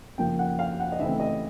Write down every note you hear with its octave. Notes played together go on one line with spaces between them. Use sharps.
C#3 F3 A#3 G5
F#5
F5
F#5
D#5
C#3 E3 A3 C4 E5
D#5